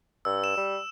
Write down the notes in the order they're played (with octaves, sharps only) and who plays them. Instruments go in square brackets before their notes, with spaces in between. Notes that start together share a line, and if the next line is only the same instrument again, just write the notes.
[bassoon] G2 [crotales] E6
[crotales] E7
[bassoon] G3